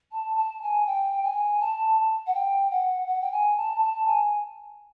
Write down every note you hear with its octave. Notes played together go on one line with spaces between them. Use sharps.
A5
A5
G#5
G5
G#5
A5
F#5
G5
F#5
F#5
G5
G#5
A5
A5
G#5